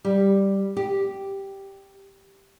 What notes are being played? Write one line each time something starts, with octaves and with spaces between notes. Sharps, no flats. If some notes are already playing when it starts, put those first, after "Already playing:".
G3
G4